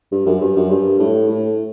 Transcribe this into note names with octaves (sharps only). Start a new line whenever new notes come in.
G2
F#2
G2
F#2
G2
A2
A2